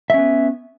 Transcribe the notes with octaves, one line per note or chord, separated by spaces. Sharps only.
B3 C#4 E5